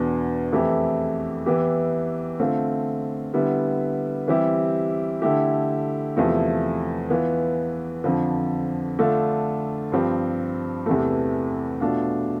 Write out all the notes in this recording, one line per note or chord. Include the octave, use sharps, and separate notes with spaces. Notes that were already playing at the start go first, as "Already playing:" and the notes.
Already playing: E2 B2 B3 D4
F2 E3 A3 E4 G4
E3 B3 E4 G4
D3 A3 C4 F4
D3 G3 B3 E4
E3 G3 C4 E4 G4
D3 A3 E4 G4
E2 C3 F3 A3 E4
E3 B3 F4
F2 D3 F3
D3 A3 D4 F4
G2 F3 C4 G4
E2 C3 E3 A3
B2 A3 D4 F4